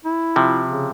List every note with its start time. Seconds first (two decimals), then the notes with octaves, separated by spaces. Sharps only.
0.05 E4
0.36 C3 F3
0.69 C#3